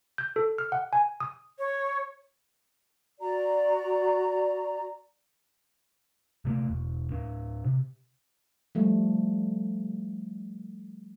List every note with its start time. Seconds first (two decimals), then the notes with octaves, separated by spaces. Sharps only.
0.18 G6
0.36 A4
0.58 F6
0.72 F#5
0.93 G#5
1.20 D#6
1.59 C#5
3.20 F#4 D5 A#5
6.45 C3 A3 A#3
6.68 E1
7.11 A2 D4
7.64 C3
8.75 F3 G3 A3